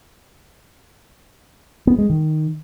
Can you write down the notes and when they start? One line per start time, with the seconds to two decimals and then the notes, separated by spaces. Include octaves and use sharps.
1.87 B3
1.98 G#3
2.10 D#3